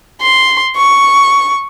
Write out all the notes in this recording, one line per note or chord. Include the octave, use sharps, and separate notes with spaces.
C6
C#6